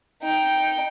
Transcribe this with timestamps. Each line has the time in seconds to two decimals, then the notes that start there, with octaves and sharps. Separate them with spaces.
0.23 D#4 G5